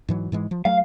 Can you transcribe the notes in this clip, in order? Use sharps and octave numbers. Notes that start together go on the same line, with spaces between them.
G#2 E3 F#3
G#2 E3 G#3
F3
F#3 A3 F5